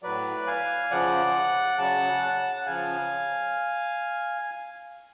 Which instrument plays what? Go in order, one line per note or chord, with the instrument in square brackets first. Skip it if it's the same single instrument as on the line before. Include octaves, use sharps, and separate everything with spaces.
[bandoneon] A2 F#3 B4 D5
F5 G#5
C#3 F3 D5 F#5
C#3 F#3 F#5 A5
F#5 A5
F#5
C#3 F3 F5 G#5